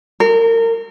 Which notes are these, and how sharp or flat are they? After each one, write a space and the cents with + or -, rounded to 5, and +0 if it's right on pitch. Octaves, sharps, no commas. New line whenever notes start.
A#4 -30